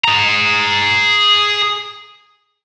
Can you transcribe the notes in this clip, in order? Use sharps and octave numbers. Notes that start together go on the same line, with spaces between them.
G#4 A#5